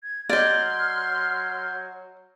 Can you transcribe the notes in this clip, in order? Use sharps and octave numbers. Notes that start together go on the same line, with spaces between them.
G#6
F#3 D5 D#5 C6 F6 G6 G#6